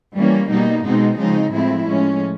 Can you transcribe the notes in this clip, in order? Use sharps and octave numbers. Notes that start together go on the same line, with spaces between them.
E3 G3 A#3 C#4
B2 G3 A#3 D#4
B2 G#3 C4 D#4
C#3 F3 G#3 C4 D#4
A2 F3 G#3 C4 E4
A2 F3 G#3 C#4